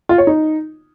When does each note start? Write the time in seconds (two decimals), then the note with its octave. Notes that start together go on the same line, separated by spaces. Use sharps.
0.09 F4
0.18 C#5
0.27 D#4